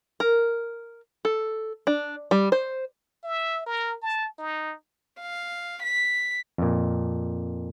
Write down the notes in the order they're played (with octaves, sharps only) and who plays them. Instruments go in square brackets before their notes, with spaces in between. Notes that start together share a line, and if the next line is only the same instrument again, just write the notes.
[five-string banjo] A#4
A4
D4
G3
C5
[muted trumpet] E5
A#4
A5
D#4
[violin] F5
B6
[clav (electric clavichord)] F2 A#2